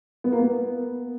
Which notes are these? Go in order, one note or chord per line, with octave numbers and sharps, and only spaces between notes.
B3
A#3
B3